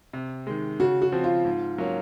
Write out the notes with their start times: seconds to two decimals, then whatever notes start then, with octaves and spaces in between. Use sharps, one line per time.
0.13 C3
0.47 D#3 G#3
0.80 C#3 F#4
1.02 F#4
1.12 F3 C4
1.24 F4
1.45 G#2
1.78 F#3 A#3 C#4